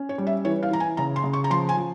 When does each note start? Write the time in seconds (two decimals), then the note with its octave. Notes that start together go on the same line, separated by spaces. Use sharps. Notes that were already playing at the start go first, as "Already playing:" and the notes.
Already playing: C#4
0.09 C#5
0.18 G3
0.27 E5
0.45 E3 C#5
0.63 F5
0.71 E3 A#5
0.80 G#5
0.97 C#3 A#5
1.16 C6
1.24 C#3
1.33 C#6
1.44 A#5
1.50 F3 C6
1.69 G#5
1.77 F3